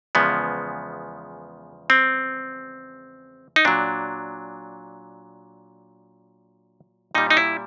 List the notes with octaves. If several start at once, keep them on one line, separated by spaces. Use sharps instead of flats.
E2 C#3 F3 G#3 B3
C4
D#4
A#2 F#3 D4
A#2 G3 D#4
D#4
E4